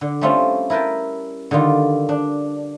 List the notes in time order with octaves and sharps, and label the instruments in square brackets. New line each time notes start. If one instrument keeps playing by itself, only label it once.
[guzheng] D3
G3 A3 C4 C#4 F4
E4 A#4 B4 G5 A5
D3 D#3 G3 F4
D4